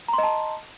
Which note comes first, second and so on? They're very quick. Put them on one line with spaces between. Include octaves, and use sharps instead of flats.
A#5 C6 D#5 A5